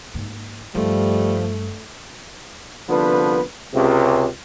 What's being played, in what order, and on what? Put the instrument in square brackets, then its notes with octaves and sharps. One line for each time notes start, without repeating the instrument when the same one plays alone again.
[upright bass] G#2 A#3
[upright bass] G2 [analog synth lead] F3 [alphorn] G3 [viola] A3
[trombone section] C2 D3 F3 B3 B4
C#2 C3